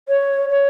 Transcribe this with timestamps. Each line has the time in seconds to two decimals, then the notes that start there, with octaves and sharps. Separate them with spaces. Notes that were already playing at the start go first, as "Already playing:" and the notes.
0.08 C#5
0.49 C#5